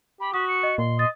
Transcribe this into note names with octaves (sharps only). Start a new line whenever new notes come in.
G4 B5
F#4 D#6 B6
C#7
D#5
A#2 C6
D#5 A6